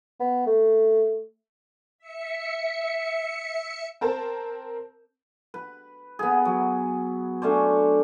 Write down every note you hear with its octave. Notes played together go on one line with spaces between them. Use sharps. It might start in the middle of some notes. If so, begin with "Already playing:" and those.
B3
A3
E5 C#7
C4 A#4 C5 A5
B4
B3 G#4
F#3
A3 C#4 D4 C5